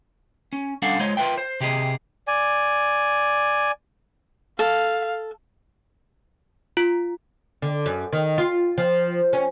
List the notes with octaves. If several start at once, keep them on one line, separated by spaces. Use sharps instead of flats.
C#4
G3 C#4 D4 A4 F5 F#5
G#3 F4 C5 C#5 D#5
F4 A#4 B4 E5 G5
C5
C3 G4 G#4 D#5
D5 G#5
A4 F5
F4
D3
F#2
D#3
F4
F3
C#4